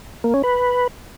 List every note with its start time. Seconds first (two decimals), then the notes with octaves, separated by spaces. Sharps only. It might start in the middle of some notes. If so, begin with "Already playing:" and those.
0.24 A#3
0.34 C#4
0.44 B4